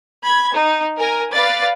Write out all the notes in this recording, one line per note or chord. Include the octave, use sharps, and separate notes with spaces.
B5 G#6
D#4
A#4 G#5
B4 D5 F5 A6